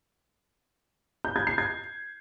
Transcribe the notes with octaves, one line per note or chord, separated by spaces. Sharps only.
G6
G#6
C7
G#6